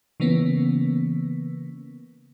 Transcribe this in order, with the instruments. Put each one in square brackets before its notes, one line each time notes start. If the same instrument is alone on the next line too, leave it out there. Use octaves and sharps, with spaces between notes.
[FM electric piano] C#3 E3 A#3 B3 C#4